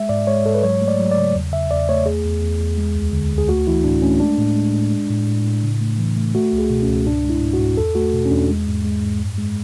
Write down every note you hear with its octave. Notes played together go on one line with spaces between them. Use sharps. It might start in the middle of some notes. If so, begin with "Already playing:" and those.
Already playing: G#3 E5
G#2 D5
G#3 C#5
G#2 A4
B4
F#3 C#5
A3
D5
F#3
D5
C#3
E2
C#3 E5
E2 D5
A3 C#5
E2 G#4
E2
E2
E2
G#3
D2
D3
D2
G#4
A3 F#4
E3 E4
A2 D4
A3 C#4
G#3 D4
A2
G#3
A2
G#3
A2
A2
A2
C#3
A3
E3
A3
A3 F#4
C#2
G#4
B2
C#4
C#2
G#2 D4
G#3
E4
G#2
F#4
G#2
E2 A4
A3 F#4
B2
C#4
E2 D4
G#3
G#2
G#3
G#2
F#2
G#3